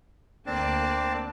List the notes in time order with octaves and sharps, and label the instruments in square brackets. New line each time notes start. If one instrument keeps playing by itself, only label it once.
[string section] D2 A#3 D5 [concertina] C4 D4 A5